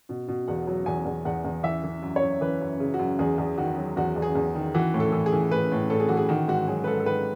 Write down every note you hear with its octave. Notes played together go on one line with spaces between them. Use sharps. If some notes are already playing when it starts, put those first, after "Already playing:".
B2
B2
E2 F#5
F#3
E2 G#5
E2
E2 F#5
E2
E3 E5
E3
F#2
C#5
F#2
E3 B4
F#2
C#3
F#4
F#2
E2 G#4
E2
D#3 F#4
F#3
E2 F#4
E2
G#4
E2
D#3
E3 F#4
A2
A4
E3
G#4
E3
A2 B4
A2
A2 A4
G#4
E3 F#4
G#4
D#3 F#4
G#2 F#4
F#3 G#4
B4
G#2 A4
A4
D#3 B4